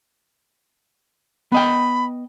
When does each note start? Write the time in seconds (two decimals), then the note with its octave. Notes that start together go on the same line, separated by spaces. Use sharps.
1.52 B3 D#5 G5 B5